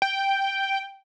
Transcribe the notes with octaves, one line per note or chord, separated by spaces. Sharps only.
G5